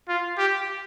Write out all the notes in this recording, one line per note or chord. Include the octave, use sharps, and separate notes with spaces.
F4
G4